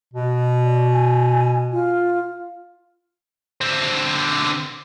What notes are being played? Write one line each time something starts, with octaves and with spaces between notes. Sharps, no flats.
B2
D5
G#5
F4
D3 C4